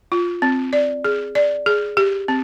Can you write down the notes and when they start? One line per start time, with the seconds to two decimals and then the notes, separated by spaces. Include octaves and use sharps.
0.12 F4
0.42 C4
0.73 D5
1.05 G#4
1.35 D5
1.66 G#4
1.97 G4
2.28 C4